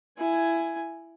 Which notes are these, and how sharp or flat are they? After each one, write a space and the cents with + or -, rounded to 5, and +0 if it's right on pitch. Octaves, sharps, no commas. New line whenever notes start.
E4 +15 G#5 +0